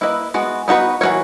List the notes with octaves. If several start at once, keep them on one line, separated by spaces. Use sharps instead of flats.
A#3 E4 B4 D#5
G#3 B3 F#4
B3 D#4 F#4 B4
E3 B3 F#4 A#4 C#5